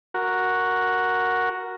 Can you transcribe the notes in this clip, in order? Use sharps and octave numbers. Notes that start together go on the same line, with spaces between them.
F#4 A#4